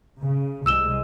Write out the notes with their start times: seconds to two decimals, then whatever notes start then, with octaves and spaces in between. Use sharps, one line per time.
0.19 C#3
0.66 C2 G#3 E6 E7 G7